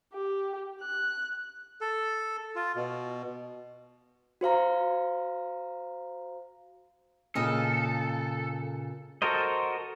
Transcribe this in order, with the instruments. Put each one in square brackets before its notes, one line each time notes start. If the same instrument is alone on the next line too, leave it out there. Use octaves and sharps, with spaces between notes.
[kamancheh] G4
F#6
[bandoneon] A4
F4
B2
[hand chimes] F#4 C5 F5 A#5
[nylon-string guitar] A#2 C#3 D#5 [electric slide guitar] A4
[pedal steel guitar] F#4 A4 A#4 C5 D#5